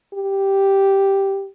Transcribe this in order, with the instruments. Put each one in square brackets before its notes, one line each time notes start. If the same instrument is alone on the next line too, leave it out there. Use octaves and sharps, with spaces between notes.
[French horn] G4